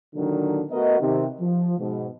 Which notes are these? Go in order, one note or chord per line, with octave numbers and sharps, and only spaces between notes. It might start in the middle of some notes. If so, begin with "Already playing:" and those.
A#2 D3 D#3 F#3 D4
A3 B3 F#4 A#4 D#5
C3 D#3
F3
G#2 B2